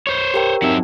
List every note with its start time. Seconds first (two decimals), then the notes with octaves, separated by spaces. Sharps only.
0.07 C5 C#5
0.34 G4 A#4 G5
0.62 F#3 C4 D#4 E5